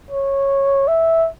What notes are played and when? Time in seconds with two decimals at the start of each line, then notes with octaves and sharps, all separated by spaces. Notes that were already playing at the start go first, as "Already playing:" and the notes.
0.11 C#5
0.88 E5